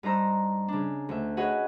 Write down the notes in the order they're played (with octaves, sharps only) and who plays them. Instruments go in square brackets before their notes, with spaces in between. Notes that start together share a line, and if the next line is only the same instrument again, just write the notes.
[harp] G2 D#4 C5 A#5 E6
C#3 D4
D2 E5
F#4 G#4 B4 C#5 D#5 F#5